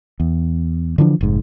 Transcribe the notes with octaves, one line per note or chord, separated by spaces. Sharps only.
E2
D3 E3 F3 D4
F1 G#2